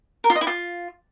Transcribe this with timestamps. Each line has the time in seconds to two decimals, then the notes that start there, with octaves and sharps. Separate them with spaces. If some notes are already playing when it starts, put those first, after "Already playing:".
0.24 A#4
0.30 F4
0.35 D#5
0.41 E4
0.47 F4